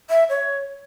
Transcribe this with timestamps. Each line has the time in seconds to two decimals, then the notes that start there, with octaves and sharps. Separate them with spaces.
0.10 E5
0.29 C#5